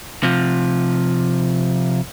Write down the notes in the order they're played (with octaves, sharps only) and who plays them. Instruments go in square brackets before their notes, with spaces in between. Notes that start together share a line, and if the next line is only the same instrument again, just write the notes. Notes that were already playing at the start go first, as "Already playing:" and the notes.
[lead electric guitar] C3 F3